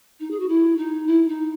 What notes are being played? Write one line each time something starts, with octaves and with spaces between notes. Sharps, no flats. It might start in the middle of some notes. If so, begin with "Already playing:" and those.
D#4
G#4
F#4
E4
D#4
E4
D#4